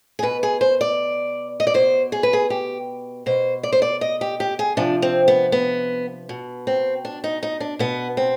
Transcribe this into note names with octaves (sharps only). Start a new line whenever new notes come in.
G#4
B2 B4
G#4
C5
D5
D#5
D5
B2 C5
G#4
B4
G#4
G4
B2 C5
D5
C5
D5
D#5
G4
G4
G#4
C3 F3 D4
C4
B3
B3
B2
C4
D4
D#4
D#4
D4
B2 B3
C4